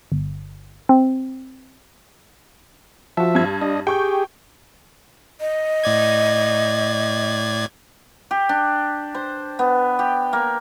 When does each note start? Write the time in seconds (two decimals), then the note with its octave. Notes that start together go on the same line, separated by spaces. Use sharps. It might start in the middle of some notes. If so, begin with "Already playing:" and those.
0.12 G1
0.89 C4
3.17 F3 F#4 E5 A5
3.35 G2 G#6
3.61 D4 D#5
3.87 G4 G#4 G5 C#6 G6
5.41 D#5
5.84 A2 D5 G#6
8.31 G4
8.49 D4
9.15 C5
9.59 B3
9.99 G4
10.33 A#3